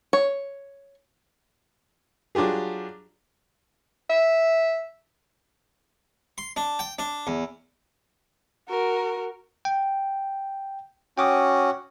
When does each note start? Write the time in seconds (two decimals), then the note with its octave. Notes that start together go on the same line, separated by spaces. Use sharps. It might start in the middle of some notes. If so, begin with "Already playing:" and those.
0.13 C#5
2.35 F#3 D4 F4 G4 G#4
4.10 E5
6.38 C6
6.56 D4
6.79 G5
6.99 D4
7.27 E2
8.69 F#4 A#4
9.65 G5
11.17 C#4 F#4 G5 D6 D#6